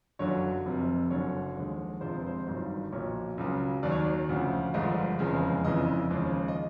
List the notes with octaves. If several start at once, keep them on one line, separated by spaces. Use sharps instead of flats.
G1 F#2 D3 F#3 C#5
F1 F2 C3
F#1 F#2 D3 C#5
D#2 D3 F3 G#3
G1 F2 C3 F3 G#3 C5
B4
C5
G1 G2 D#3 F#3
B1 A#2 F3 C#5
C#2 C#3 F#3
D#2 D#3 F#3 D5
C#5
D5
D2 C#3 F3
G1 G2 D3 F3 G#3 D#5
F1 E2 C#3 F3 G#3
G1 F2 C#3 E3 D#5
D#2 C#3 F3 G#3
D#5